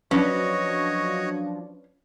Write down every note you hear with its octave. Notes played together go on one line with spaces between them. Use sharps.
F3 F#3 C#4 D4 F#4 B4 C#5 D#5